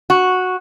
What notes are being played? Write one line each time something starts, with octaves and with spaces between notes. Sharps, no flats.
F#4